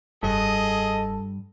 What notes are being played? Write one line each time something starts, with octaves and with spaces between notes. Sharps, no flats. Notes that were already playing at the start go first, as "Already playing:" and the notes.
F1 G2 G#4 A4 D#5